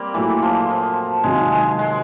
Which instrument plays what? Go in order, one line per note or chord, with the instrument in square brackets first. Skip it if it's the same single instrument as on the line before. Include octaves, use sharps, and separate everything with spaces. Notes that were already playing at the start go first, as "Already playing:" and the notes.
Already playing: [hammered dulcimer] G3 A#3 C4
[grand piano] A#2 F#3 A3 [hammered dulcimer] E3
[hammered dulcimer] F3
F3
[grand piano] C3 D#3 F#3 [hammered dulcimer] G#3
[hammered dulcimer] G#3
G#3